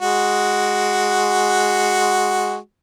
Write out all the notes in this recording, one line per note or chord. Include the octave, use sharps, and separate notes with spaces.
G#3 F#4